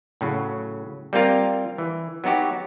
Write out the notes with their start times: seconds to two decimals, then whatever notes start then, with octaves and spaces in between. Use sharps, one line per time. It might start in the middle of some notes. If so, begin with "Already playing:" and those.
0.21 A2 C#3 F#3
1.13 G3 A#3 C4 F4 A#4
1.78 E3
2.24 F#3 B3 D#4 F#4 G4